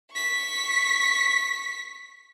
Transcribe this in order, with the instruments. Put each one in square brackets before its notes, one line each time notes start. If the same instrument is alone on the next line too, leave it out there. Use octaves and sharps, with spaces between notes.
[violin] C#6 B6